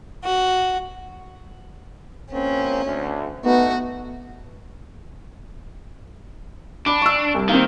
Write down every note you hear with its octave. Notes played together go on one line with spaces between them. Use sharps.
F#4
A#1 A#3 C4 C#4
D2
A3 B3 D#4 F#4
D4 B5 D6
C#6 E6
C2
D#3 A#3 C4